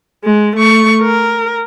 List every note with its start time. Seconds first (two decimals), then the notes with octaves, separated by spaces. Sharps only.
0.24 G#3
0.56 A3 C#6
1.02 A#4